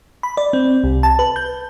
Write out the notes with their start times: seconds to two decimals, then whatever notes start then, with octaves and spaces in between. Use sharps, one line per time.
0.23 B5
0.37 D5
0.53 C4
0.84 C2
1.03 A5
1.19 B4
1.36 G6